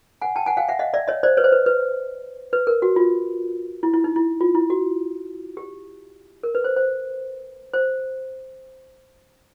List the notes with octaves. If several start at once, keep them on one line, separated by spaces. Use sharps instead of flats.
F#5 G#5
G5 A5
F#5 G#5
F5 G5
E5 F#5
D#5 F5
D5 E5
C#5 D#5
C5 D5
B4 C#5
C5
B4
B4
B4
A#4
F#4
F4
E4
E4
D#4
E4
F4
E4
F#4
G4
A#4
B4
C5
C5
C5